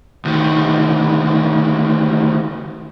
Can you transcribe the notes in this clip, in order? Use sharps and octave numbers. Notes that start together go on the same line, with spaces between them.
D2 D#3